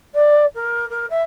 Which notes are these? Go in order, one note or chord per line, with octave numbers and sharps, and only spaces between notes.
D5
A#4
A#4
E5